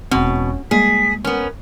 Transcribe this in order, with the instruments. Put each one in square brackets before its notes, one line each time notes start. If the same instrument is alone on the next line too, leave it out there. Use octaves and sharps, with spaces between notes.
[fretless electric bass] E1 C4 [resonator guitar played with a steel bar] B2 [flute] C#4
[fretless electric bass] G3 G#3 A#3 [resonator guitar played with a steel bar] G#4 [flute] B6
[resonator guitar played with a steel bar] B3 C#4 [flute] A#4